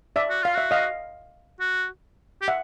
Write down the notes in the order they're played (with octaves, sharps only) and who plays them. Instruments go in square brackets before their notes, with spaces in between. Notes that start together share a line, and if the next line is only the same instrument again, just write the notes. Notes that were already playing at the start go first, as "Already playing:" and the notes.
[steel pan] D5 E5
[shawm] F#4
[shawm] F4 [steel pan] F5
[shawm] F#4 [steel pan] E5
[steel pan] D#5 F5
[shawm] F#4
G4
[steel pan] E5 F#5